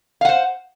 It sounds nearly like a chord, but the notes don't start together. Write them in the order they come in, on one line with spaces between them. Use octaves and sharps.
F5 F#5 C5